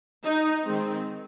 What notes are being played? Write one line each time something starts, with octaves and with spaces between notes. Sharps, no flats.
D#4
D#3 G#3 C4